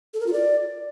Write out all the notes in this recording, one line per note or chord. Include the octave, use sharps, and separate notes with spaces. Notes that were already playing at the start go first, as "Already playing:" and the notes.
A4
A#4
F4
D5